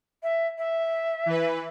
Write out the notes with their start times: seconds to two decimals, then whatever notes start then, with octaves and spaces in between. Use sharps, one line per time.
0.22 E5
0.57 E5
1.26 E3 B4